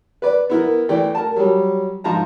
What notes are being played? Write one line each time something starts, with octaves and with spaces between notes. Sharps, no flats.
B4 D5
B3 E4 A#4
E3 A3 D5 G5
A#4 A5
F#3 G3
G#2 F3 A5 A#5